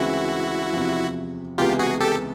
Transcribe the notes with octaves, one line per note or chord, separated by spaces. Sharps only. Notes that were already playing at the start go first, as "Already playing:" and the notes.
Already playing: D2 C#3 E3 G#3 C4 E4 F#4
E2 C3 F3
C#2 C3 E3 G#3 B3 F4 G4
F#4 G#4
G4 A4